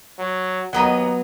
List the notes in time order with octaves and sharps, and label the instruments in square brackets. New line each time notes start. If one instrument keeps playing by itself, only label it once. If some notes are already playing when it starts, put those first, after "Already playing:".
[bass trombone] F#3
[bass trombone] D#2 [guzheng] F#3 B3 D#5 [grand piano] F#5 A#5